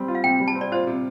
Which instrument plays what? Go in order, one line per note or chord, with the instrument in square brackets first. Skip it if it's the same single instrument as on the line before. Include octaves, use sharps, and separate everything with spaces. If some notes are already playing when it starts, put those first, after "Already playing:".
Already playing: [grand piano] G3 C4
F4
[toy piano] F5
[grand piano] C3 [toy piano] G5
[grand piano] G3
[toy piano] A5
[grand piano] C4
[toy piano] D5
[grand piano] F4 [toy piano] C5
[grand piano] C3